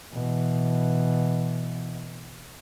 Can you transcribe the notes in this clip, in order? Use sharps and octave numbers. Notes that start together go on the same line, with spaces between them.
B2 E3